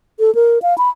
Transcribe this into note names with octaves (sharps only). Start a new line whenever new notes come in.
A4
A#4
F5
B5